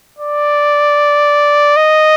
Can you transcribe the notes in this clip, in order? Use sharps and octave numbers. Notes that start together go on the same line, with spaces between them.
D5
D#5